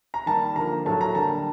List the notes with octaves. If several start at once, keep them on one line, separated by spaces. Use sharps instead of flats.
A#5
D#3 G3 A#3 A5
D3 F3 A#3 A#5
A2 F#3 A3 A5
A#5
D3 G3 A#3 A5